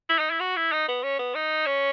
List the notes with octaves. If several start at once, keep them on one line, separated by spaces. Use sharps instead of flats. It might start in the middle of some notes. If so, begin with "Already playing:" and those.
E4
D#4
E4
F#4
E4
D#4
B3
C#4
B3
D#4
C#4